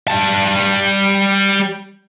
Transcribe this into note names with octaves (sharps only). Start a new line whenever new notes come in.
G3 A5